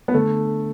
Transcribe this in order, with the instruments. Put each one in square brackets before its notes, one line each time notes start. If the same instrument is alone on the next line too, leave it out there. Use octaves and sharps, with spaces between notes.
[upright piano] B3
[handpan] D3 [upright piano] A3